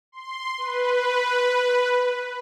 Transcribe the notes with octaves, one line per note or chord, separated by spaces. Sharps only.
C6
B4